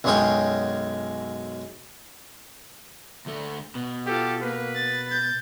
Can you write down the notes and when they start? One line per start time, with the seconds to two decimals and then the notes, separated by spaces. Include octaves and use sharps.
0.04 B1 F#2 G#3 C#4 C#5 G5
3.26 D2 A3
3.75 B2
4.06 F4 G4 A4
4.42 A#3 B4
4.75 A6
5.09 G6 A6